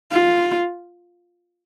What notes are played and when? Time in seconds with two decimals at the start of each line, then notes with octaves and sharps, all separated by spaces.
0.12 F4